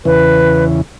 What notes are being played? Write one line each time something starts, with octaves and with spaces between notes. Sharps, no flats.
E2 C#3 E3 B4